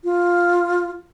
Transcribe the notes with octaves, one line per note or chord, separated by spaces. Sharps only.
F4